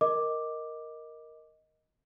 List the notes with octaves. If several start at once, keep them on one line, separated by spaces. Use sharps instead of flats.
A#4 D#5 D6